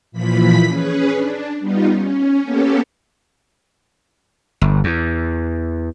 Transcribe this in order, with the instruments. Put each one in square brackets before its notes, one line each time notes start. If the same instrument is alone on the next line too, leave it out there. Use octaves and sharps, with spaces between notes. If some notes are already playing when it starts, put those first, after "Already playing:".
[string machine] A#2 E3 F3 B5 B6
C#4 G#4 B4
D4
G3 B3 D#4 F4
C#4
A#3 B3 C#4 G4 A4
[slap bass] G1
E2